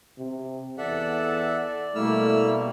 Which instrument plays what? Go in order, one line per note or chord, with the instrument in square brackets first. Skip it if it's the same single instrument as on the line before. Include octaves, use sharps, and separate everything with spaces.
[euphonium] C3
[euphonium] E2 [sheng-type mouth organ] A4 E5 F#5 [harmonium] D5
[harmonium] B2 G3 A#3 [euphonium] A3 [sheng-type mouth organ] E4 E6 F6